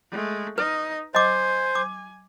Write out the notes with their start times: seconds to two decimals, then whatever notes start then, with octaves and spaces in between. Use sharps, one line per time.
0.11 G#3 A3
0.58 D#4 B4 D#5
1.15 C5 D#5 G#5 D6
1.75 D6